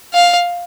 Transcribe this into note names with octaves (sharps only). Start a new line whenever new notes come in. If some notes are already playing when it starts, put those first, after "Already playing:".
F5